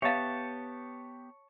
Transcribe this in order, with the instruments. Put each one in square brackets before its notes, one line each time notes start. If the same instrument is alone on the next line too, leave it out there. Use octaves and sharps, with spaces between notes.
[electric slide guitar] B3 G4 [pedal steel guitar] C#5 A5 [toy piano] E5 F5